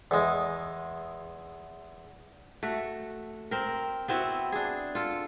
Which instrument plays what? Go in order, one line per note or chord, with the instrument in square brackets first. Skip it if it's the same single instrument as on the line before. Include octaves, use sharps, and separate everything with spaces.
[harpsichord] E2 G#3
[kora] A3 F#4
C4 A#4
B3 C4 E4 F#4
D4 G#4
F4 A4